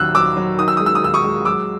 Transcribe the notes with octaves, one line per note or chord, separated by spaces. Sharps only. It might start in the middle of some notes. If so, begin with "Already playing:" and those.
Already playing: D#2 F#3 E6 F#6
F#3 D6 E6
F#3
D#3 D#6
E6
G#3 D#6
E6
D#6
D#2 E6
C#6 D#6
G#3
F#3 D6 E6